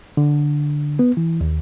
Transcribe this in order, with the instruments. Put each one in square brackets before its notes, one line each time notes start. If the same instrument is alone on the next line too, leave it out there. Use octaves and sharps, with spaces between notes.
[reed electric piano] D3
B3
E3
D#2